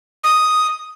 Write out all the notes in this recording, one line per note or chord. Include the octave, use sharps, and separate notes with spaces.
D#6